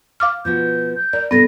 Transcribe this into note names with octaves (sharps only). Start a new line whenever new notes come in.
F5 D6 F6
B2 F3 B3 G6
G6
A#4 D5
G2 C3 B3 A4 A#6